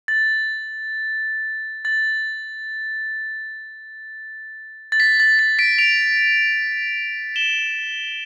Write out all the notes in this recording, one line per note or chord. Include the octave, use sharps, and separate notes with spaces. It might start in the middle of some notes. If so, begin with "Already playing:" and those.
A6
A6
A6
B6
A6
B6
B6 D7
D7 F7
E7 G7